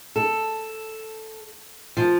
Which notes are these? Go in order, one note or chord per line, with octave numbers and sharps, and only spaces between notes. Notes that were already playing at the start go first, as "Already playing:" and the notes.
A4
F3